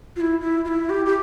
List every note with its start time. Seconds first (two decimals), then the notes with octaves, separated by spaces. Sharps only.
0.16 F4
0.21 E4
0.40 E4
0.65 F4
0.68 E4
0.90 G4
1.06 G4